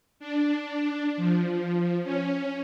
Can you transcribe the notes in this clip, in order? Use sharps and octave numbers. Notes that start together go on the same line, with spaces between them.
D4
F3
C#4